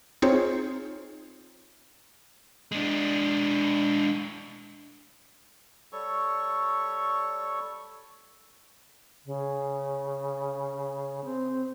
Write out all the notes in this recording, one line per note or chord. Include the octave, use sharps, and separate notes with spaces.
C4 D#4 F4 G#4 C5 C#5
G#3 D4
G3 A4 C#5 C#6
C#3
C4